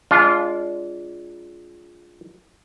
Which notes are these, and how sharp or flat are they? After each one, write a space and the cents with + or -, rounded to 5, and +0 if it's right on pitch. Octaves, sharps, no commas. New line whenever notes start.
G#3 +0 D4 -30 F4 +0